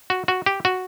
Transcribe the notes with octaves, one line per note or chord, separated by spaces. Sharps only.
F#4
F#4
G4
F#4